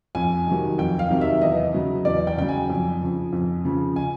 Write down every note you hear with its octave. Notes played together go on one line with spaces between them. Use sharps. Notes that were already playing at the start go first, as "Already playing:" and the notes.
F2 G#5
C3 D#3 F#3
F2 G5
F5
C3 D#3 F#3
E5
E2 D#5
C#3 F#3
E2 D5
G5
C#3 F#3 G5
G#5
F2
C#3 F3
F2
C#3 F3
G#5